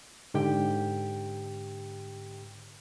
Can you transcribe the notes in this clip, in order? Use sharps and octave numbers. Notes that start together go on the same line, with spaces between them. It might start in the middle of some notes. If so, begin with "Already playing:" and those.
G#2 D3 G4 G5